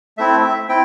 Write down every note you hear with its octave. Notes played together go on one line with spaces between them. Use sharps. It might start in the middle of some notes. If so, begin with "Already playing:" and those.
A3 C4 E4 E5
C4 E4 G5